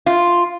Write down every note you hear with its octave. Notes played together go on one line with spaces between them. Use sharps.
F4